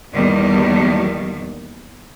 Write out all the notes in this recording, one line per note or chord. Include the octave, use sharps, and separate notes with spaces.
E2 A#2 D#3 G3